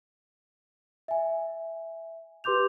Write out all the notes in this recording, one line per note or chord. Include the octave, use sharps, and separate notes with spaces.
E5 G#5
G4 B4 C6 D6 G6 F7